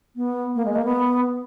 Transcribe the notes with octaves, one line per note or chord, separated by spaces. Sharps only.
B3
A#3
G#3
A#3
B3